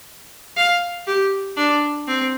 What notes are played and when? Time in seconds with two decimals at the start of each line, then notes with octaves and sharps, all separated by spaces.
0.57 F5
1.07 G4
1.57 D4
2.08 C4